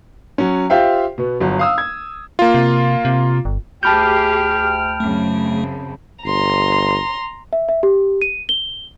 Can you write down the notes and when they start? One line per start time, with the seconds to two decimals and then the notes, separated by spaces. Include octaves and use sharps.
0.38 F#3 C#4
0.70 F4 G4 C5 E5 F5 G5
1.18 B2 B3
1.41 G1 F#3
1.59 F5 D#6 E6
1.78 G#6
2.39 A#3 F4
2.54 C3
3.05 C3
3.45 G1
3.83 D2 G4 G#4 G5 A5 B5 F6 G6
5.00 F#2 C#3 A3 C4
6.24 G1 A#5 C6
7.53 E5
7.69 E5
7.83 G4
8.22 D#7
8.49 G7